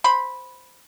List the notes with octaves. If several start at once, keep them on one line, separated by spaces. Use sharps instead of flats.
C5 B5